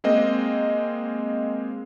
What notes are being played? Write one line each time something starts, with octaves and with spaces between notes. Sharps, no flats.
G#3 A#3 C4 D#5